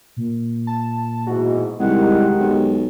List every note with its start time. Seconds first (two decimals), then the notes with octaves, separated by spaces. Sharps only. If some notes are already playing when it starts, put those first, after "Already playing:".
0.17 A#2
0.67 A5
1.27 G#2 B2 E3 F#4
1.80 C2 D#3 G#3 G4 F#5
2.40 B1